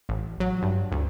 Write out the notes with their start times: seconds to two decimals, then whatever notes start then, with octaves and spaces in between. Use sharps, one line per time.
0.09 A1
0.40 F#3
0.63 G2
0.92 D2